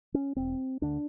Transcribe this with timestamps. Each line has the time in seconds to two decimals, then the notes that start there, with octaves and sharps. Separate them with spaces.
0.14 C#4
0.37 E1 C4
0.82 D2 D3 D4